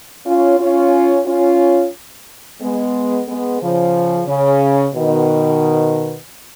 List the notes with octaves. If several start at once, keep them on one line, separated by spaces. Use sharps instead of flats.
C#4 F4
C#4 F4
C#4 F4
G#3 B3
G#3 B3
C#3 F3
C#3
B2 D#3